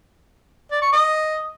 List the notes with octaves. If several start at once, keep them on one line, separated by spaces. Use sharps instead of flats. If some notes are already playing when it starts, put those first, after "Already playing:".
D5
C#6
D#5